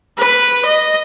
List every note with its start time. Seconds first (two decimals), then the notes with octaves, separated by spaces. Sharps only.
0.18 B4
0.65 D#5